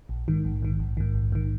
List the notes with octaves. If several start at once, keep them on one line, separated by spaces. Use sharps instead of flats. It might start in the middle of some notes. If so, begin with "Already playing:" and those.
A#1
G#2 D#3
A#1
G#2 D#3
A#1
G#2 D#3
A#1
G#2 D#3